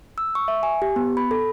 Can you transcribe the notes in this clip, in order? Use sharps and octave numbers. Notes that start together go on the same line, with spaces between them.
E6
C#6
E5
G#5
G4
B3
B5
A4